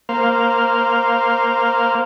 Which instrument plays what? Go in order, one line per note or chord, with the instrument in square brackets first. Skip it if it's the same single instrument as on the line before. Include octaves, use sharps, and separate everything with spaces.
[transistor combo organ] A#3 C5 F5